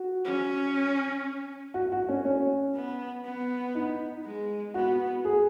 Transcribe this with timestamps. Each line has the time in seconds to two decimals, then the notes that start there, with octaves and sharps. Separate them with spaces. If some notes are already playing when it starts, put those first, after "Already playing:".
Already playing: F#4
0.25 C#4
1.74 F#4
1.92 F#4
2.09 C#4
2.25 C#4
2.75 B3
3.24 B3
3.75 D#4
4.25 G#3
4.74 B3 F#4
5.25 G#4